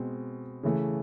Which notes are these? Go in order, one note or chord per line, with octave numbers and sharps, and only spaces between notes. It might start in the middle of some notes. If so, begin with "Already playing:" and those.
Already playing: B2 G#3 C4
C#3 E3 A3